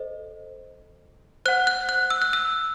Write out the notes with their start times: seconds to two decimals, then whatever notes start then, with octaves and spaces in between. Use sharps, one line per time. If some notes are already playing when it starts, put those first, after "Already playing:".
Already playing: A4 C5 D#5
1.46 C5 F#5 F#6
1.67 F#6
1.89 F#6
2.10 E6
2.22 F#6
2.33 E6